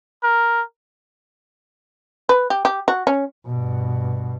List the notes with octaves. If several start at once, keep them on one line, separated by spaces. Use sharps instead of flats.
A#4
B4
G4
G4
F#4
C#4
G2 B2